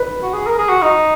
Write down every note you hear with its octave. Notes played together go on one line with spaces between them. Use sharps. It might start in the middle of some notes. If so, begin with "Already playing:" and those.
Already playing: B4
F#4
G#4
A#4
G#4
F#4
D#4